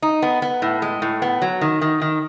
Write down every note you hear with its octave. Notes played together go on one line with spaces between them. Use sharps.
D#4
B3
B3
A2
G#3
A2
B3
F#3
D#3
D#3
D#3